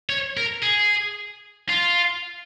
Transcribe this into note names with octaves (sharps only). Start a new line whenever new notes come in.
C#5
A#4
G#4
F4